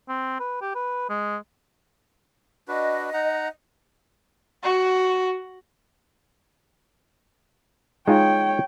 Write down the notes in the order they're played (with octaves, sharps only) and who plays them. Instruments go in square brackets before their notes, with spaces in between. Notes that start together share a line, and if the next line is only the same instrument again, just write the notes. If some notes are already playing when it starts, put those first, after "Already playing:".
[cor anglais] C4
B4
G4
B4
G#3
[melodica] D4 F#4 B4 [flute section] D#5
[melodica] D#4 F#5 A#5
[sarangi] F#4
[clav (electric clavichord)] G#3 D#4 F4 [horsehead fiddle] C#5 G5